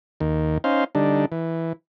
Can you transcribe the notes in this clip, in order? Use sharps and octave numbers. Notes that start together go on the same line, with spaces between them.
D#2 D#3
C#4 D#4 C5 F5
D3 G3 D4 D#4
E3